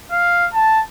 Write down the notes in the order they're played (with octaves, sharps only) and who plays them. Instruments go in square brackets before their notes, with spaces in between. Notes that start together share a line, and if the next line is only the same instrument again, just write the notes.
[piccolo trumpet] F5
A5